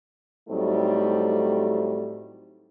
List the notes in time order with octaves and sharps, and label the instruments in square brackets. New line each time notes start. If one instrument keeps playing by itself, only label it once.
[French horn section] A2 F#3 G3 A3 C4 D#4